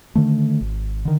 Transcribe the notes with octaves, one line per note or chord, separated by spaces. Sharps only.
D3 D#3 A3
G#1
D3 D#3